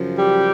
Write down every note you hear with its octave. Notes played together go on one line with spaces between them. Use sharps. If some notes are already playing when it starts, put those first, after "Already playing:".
Already playing: F#2 C#3 F3
G3 G4